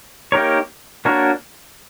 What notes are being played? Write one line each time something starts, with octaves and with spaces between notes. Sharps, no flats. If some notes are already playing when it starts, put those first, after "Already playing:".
A#3 D#4 G4 A#4 C#5
A#3 D4 F#4 A#4 C#5